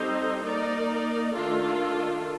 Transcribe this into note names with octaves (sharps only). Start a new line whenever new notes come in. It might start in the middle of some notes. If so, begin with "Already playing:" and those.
Already playing: G3 C4 D#4 A4 C5
A#3 D#4 A#4 D5
D#3 A3 D4 F4 A4